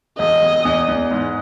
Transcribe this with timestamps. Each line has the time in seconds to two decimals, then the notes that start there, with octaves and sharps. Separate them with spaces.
0.19 E1 D#5
0.42 E1
0.65 E2
0.88 E2
1.11 G#2